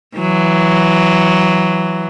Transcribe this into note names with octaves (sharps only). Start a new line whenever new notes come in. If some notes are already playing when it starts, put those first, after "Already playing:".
E3 F#3